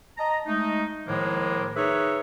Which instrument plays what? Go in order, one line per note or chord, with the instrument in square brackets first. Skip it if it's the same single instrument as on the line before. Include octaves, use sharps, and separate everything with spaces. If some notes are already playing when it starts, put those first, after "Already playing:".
[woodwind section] D#5 A5 A#5
G#3 A3 D#4
A2 D#3 F3 G#3 A#3
D#4 G#4 B4 C#5 E5